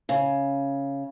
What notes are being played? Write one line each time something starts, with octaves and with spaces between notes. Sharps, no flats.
C#3